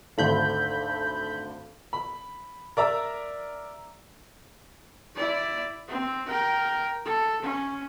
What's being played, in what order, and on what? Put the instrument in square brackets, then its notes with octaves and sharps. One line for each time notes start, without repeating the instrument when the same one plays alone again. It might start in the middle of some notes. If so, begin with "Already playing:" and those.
[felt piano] G#1 D2 D3 [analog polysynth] A4 B5 G6
[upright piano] B5
A#4 D5 E5 A#5 E6
[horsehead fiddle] E4 D5
C4
A#4 G5
A4
C#4